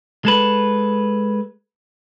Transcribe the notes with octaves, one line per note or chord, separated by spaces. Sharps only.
G#3 A4 B4